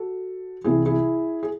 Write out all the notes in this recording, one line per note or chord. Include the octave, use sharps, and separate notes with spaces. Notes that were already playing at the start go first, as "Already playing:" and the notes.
Already playing: F#4 A4
C2 C3 E3 E4 G#4
E4 G#4
G#4